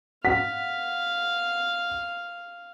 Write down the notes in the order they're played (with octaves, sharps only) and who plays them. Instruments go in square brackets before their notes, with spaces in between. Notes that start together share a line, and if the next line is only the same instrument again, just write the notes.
[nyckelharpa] F5 [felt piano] F#5 B6